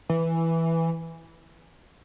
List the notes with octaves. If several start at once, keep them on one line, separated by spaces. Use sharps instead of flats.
E3